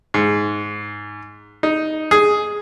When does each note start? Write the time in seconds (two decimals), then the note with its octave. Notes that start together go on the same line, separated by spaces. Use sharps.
0.14 G#2
1.63 D#4
2.11 G#4